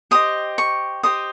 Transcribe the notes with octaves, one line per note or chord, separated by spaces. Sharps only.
G4 C5 D#5 D#6
C#6
G4 C5 D#5 D#6